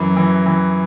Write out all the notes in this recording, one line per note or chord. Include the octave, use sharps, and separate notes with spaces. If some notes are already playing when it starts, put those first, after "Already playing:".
Already playing: F#2 E3
E3
E3